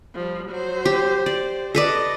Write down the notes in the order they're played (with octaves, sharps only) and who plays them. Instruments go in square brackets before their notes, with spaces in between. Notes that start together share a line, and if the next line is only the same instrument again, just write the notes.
[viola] F3 G3
F#3 C5
[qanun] G4
[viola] C5 [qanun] D5
[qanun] A4 B4 D5 [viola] D#5